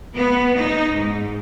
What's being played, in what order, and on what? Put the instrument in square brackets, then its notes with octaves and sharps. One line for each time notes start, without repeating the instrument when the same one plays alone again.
[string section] B3
D#4
G#2